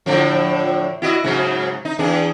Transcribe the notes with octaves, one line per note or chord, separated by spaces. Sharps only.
A2 D3 F3
E4 F#4 D#5
G#2 C#3 F#3
D#4
E2 D4 G#4